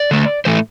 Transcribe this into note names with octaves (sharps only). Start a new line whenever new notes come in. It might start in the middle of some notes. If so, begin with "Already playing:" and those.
Already playing: D5
D3 A3
A2 E3 A3 C5